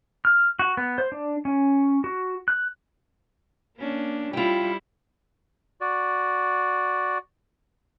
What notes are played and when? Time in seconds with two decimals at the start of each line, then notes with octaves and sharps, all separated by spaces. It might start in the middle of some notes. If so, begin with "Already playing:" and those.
0.25 F6
0.59 F#4
0.77 B3
0.98 C5
1.12 D4
1.45 C#4
2.04 F#4
2.48 F#6
3.78 A#3 C#4 D4
4.33 G3 E4 F4 G5
5.81 F#4 D5